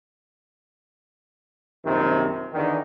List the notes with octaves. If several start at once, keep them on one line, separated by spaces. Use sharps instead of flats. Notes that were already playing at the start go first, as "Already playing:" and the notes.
A#1 F#2 C3 D#3
E2 D3 D#3